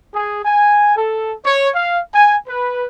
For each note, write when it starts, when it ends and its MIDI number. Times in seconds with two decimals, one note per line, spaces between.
0.14 0.39 68
0.45 0.93 80
0.96 1.31 69
1.45 1.68 73
1.75 1.99 77
2.13 2.35 80
2.48 2.86 71